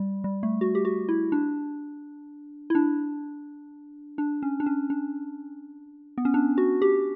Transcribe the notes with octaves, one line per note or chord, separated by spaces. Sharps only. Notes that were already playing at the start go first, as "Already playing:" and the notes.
Already playing: G3
G3
A3
F#4
G4
F#4
E4
D4
E4
D4
D4
C#4
D4
C#4
D4
B3
C#4
D4
F#4
G4